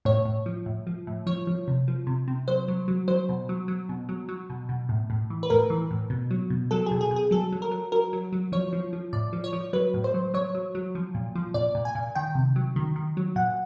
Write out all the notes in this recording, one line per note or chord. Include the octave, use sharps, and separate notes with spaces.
A2 C#5
A2
F3
A2
F3
A2
F3 C#5
F3
C3
F3
C3
C3
F#3 C5
F#3
F#3
F#3 C5
B2
F#3
F#3
B2
F#3
F#3
B2
B2
A2
A2
E3
B4
A2 A#4
E3
A2
B2
F#3
B2
F#3 A4
B2 G#4
G#4
B2
G#4
F#3 A4
F#3
A#4
F#3
F#3 A#4
F#3
F#3
F3 C#5
F3
F3
A2 D5
F3
C#5
F3
F#3 B4
A2
C5
F#3
F#3 C#5
F#3
F#3
F3
A#2
F3
A#2 D5
A#2
G#5
A#2
D#3 G5
C3
F#3
D#3
D#3
F#3
A#2 F#5